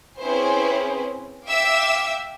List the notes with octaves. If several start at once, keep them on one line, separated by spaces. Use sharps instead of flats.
C4 C#4 E4 G#4 B4 C5
E5 F5 G5 D6 E6